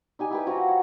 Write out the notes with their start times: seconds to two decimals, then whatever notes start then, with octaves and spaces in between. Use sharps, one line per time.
0.19 D#4 G4 G#5
0.31 E4 G4 B4
0.46 F3 F#4 A#5
0.68 C#5